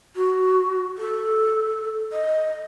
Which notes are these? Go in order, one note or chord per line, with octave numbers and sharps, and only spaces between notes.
F#4
A4
D#5